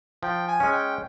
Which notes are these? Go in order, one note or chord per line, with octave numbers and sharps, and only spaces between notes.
F3 G5
G#5
G#3 C#4
G5